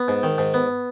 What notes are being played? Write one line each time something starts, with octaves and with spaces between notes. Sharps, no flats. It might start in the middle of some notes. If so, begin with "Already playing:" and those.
Already playing: B3
G#2
D#3
G#2
B3